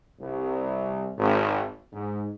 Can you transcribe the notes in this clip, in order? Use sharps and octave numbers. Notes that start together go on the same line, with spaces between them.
C2
G#1
G#2